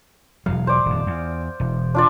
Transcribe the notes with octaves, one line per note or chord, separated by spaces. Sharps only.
E1 B1 F#3 F5
C5 D5
D#1 F2
E2
E1
D4 F4 D5